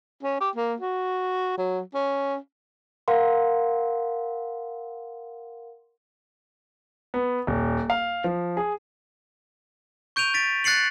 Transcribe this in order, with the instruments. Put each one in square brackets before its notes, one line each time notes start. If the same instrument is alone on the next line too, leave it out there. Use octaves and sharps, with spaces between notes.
[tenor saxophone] C#4
G4
A#3
F#4
F#3
C#4
[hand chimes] A#4 F5 F#5 C6
[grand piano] B3
D#1
F5
F3
G#4
[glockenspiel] C#6 G6 D7 D#7 F7
G6 A6 B6 D7
F#6 A6 C7 C#7 F#7